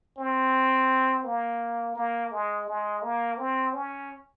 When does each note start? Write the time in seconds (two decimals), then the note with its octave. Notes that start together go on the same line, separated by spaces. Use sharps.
0.18 C4
1.24 A#3
1.95 A#3
2.31 G#3
2.68 G#3
3.02 A#3
3.38 C4
3.74 C#4